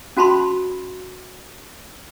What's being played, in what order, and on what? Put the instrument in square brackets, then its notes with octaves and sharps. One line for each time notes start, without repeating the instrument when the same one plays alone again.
[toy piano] C#4 F#4 A5 B5 C6